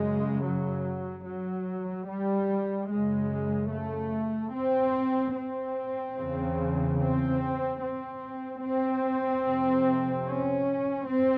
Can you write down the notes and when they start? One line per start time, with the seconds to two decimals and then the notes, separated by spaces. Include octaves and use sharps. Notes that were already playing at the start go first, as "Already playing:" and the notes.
Already playing: F#2 C#3 G#3
0.44 F#3
1.25 F#3
2.08 G3
2.90 F#2 C#3 G#3
3.71 A3
4.53 C4
5.35 C4
6.16 E2 C#3
6.99 C4
7.80 C4
8.62 C4
9.44 F2 C3
10.25 C#4
11.07 C4